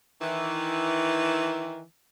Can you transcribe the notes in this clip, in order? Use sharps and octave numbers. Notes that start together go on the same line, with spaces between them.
D#3 E3